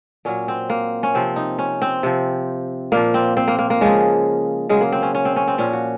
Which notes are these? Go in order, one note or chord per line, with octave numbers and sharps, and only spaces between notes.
A#2 F#3 C#4
C4
A#3
C#4
C3 F3 C4
D#4
C#4
C4
C3 F3
A#2 F3 A#3
C4
C4
A#3
A#3
A#3
C#3 F3 G#3
C#3 F#3 G#3
A#3
C4
C#4
C#4
C4
C#4
C4
A#2 F3 C#4
F#4